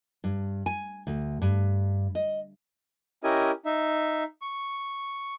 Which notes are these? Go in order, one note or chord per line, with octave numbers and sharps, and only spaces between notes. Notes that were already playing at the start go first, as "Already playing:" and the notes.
G2
G#5
D2
G2
D#5
C#4 E4 G4 A#4 D#5 G#5
D#4 E5
C#6